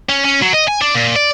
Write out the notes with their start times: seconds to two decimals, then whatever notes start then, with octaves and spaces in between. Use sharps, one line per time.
0.09 C#4
0.25 C#4
0.42 F#3
0.54 D#5
0.68 G#5
0.81 D4
0.95 A#2
1.16 D5